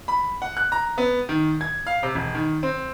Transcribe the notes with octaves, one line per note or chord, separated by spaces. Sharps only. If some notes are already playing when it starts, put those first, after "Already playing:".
B5
F#5
F#6
A#5
B3
D#3
G#6
F5
C3
E1
D#3
C4